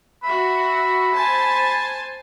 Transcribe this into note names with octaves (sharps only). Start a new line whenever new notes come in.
F#4 E5 B5
C5 G#5 A5